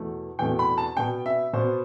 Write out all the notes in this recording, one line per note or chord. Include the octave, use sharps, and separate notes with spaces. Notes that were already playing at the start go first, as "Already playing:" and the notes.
Already playing: E2 B2 A3
E2 B2 A3 G5
B5
A5
B2 B3 G5
E5
B2 B3 C5